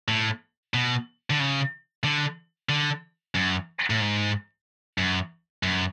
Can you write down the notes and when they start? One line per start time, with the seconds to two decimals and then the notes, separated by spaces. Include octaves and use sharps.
0.08 A2
0.74 B2
1.30 D3
1.40 C#3
2.04 D3
2.69 D3
3.35 F#2
3.90 A2
4.01 G#2
4.98 F#2
5.63 F#2